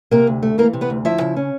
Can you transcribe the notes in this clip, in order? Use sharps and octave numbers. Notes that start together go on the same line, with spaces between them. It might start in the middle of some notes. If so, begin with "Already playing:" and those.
C3 A#3 A#4
D2
A3
E3 A#3 A#4
C3
B3 B4
D2
F3 E4 E5
C#3
C#4